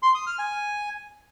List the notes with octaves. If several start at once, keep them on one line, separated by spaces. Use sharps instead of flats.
C6
D#6
F6
G#5